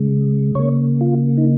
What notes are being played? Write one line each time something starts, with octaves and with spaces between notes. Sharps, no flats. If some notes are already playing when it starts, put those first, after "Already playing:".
Already playing: C#3 G#3
C#3 A#3 C#5
F4
D#4